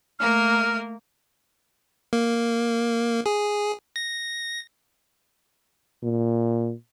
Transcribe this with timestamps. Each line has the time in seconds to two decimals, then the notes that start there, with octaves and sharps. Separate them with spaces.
0.19 A3 A#3 A#4 F6
2.13 A#3
3.26 G#4
3.96 A#6
6.03 A#2